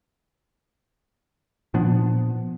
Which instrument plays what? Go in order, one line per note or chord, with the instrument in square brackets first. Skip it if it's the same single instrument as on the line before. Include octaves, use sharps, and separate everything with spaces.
[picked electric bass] A#2 F3 B3 D4